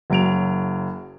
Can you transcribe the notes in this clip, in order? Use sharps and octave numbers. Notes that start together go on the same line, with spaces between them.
F#1 F#3 D7 F7